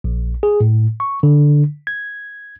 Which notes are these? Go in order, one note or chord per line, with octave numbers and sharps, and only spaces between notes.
A#1
G#4
A2
C#6
D3
G#6